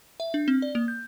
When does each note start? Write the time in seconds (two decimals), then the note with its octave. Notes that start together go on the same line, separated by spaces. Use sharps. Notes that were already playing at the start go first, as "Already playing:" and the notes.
0.20 E5
0.34 D4
0.48 C4
0.62 D5
0.75 A#3
0.88 G6